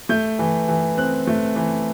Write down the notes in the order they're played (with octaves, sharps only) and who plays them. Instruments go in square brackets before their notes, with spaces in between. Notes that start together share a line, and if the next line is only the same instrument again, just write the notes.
[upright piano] A3 G6
E3
E3
C4 F#6
A3
E3